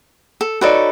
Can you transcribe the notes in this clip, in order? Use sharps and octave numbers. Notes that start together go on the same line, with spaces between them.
A4
D#4 F#4 A4 B4 C#5 D5